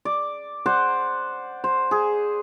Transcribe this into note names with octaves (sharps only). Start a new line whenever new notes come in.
D5
C5 D5 F#5
C5
G#4